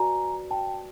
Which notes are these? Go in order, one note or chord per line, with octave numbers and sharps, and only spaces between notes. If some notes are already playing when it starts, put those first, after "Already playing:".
Already playing: F#4 B4 D5 G#5 A#5
G5 A5